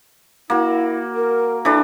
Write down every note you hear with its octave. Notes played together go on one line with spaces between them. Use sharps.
A#3 E4 F#4
A#4
E3 D4 A4